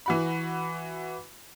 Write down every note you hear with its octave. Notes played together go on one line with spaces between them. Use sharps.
E3 F#4 B5